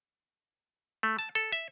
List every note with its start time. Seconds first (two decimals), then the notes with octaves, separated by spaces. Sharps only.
1.03 A3
1.19 A5
1.35 A4
1.52 E5